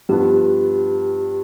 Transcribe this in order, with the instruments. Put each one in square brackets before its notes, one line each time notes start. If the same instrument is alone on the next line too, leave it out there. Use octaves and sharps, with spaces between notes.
[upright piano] G2 F3 B3 [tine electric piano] G4